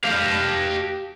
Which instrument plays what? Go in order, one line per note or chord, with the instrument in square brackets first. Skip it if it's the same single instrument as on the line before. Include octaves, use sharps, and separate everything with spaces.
[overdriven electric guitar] G4 F5